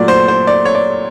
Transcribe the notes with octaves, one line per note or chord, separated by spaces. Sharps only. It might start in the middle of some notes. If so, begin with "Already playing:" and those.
Already playing: A#2 F#3 A3 D5
C5
C5
D5
C#5
D5